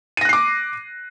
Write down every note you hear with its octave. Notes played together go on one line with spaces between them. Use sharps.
D6 F#6 A#6 C7 D#7